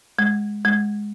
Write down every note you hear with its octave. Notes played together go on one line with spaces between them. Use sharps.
G#3
G#3